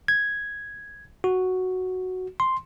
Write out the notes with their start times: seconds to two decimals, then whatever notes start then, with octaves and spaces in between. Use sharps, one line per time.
0.08 G#6
1.24 F#4
2.40 C6